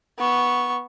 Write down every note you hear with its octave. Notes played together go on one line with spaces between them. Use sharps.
B3 C#6